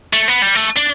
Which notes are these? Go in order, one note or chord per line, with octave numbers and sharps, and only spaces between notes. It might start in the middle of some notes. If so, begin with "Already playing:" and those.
A3
B3
G3
A3
D4